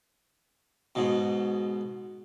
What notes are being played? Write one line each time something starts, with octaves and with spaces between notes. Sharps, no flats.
G#2 B2